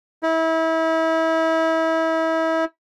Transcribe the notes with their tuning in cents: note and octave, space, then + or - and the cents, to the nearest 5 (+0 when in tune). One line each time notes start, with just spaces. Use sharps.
E4 -30